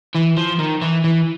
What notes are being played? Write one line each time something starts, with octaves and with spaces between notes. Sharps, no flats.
E3
F3
D#3
E3
E3